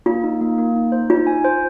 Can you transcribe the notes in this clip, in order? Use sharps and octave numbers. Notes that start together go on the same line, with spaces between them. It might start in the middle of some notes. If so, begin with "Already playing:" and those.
A#3 F4
D#4
A#3
A#3
D#4
C5
D#4 F4
G#5
C5